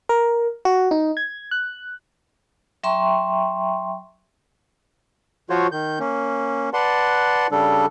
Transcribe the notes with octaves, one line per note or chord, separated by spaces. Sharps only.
A#4
F#4
D#4
G#6
F#6
F#3 E5 G5 A#5 C6 C#6
F3 F4 F#4 C5 C#5
D#3 G6
A#3 C#4
B4 D5 F#5 A5 C6
C#3 G3 D4 A4